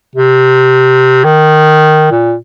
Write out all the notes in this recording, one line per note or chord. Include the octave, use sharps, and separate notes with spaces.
C3
D#3
A#2